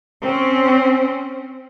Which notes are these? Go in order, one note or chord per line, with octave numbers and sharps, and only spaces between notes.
C4 C#4